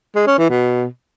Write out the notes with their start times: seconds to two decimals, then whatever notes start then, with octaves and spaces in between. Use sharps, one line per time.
0.15 G#3
0.27 C#4
0.38 E3
0.50 B2